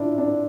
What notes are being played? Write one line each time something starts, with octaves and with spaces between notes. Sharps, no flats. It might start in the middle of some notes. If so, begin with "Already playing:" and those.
Already playing: D4 E4 F4
D4